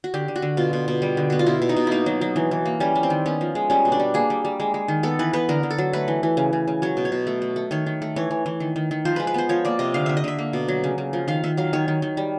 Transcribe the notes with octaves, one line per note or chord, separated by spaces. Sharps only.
F#4
D3 G4
D3
F#4
D3
B2 F4
B2
B2
G3
D3
B3 F#4
F4
B2 E4
B2
D#4
B2
A#3 D#4 E4
F#3
F#3
E3
E3
A#3
G3 C#4
G3
C4
D#3
B3 C#4
F3
G#3
G3 C#4
B2
D4
G3
A#3 G#4
G3
G3
G#3
G#3
D#3
B3 A4
E3 B4
B3 B4
D3 A#4
D3
A4
F#3
A3 B4
E3
E3
C#3
C#3
C#3
F#3 C#5
B2
C#5
B2
A3
A3
A3
D#3 C#5
D#3
A3
E3 C#5
E3
E3
D#3
D#3
D#3
F3 C5
G#3 B4
B4
B3 C5
F3 C#5
A#3 D5
C3 D#5
D3 F5
D3 E5
D#5
D3 E5
A#3
B2
F#3
C#3
C#3
F3
D#3 F5
D#3 E5
F#3 F5
D#3 C#5
D#3
D#3
G3